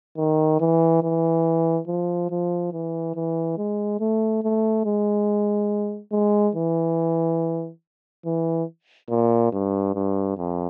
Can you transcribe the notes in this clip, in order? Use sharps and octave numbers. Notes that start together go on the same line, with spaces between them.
D#3
E3
E3
F3
F3
E3
E3
G#3
A3
A3
G#3
G#3
E3
E3
A#2
G2
G2
F2